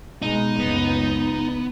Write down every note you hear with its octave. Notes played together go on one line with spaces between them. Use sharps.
B2 G#3 B3 D#4
F#1 C#2 B3